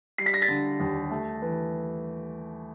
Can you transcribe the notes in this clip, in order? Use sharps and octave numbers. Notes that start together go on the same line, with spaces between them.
G3 C7
B6
A#6
A6 B6
D3
D#2
A3
E3